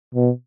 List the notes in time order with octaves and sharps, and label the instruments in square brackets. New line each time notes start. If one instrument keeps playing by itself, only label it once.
[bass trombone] B2